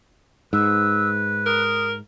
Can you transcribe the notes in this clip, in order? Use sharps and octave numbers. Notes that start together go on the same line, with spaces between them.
G#2 B4 E6
A#4 D#6